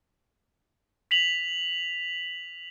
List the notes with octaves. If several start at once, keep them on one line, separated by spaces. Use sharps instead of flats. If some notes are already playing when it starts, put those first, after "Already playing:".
B6 F7 F#7